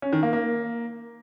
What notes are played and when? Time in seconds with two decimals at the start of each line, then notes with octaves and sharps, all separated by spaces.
0.02 C#4
0.13 D#3
0.23 A#3
0.33 A#3